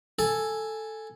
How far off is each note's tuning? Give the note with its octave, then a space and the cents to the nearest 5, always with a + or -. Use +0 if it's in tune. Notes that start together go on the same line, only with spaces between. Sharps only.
A4 +0 G#5 +0